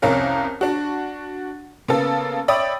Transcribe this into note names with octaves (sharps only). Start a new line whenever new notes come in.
C2 F2 C#4 A#4 F5
D4 F#4
C#3 A#3 B3 A4
C#5 D5 E5 G5 B5 D#6